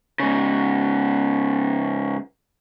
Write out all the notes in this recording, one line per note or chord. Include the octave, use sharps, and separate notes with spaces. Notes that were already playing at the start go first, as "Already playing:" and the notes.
G#2 C#3